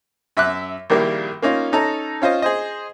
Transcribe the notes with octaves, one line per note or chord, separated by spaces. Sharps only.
F#2 E5 D6 F#6
A#1 D#3 G3 A#3 E4
A#3 C#4 D#4 F4
C#4 D#4 A4 A#5
C#4 F4 C5 D#5
G#4 C5 D#5